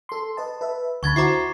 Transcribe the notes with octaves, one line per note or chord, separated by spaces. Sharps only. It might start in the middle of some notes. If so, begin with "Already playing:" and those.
A4 C6
B4 D#5 A5
B4 E5
D2 D3 B5 C#6 G#6 A6
E4 F#4 C5 A#5 D6 C7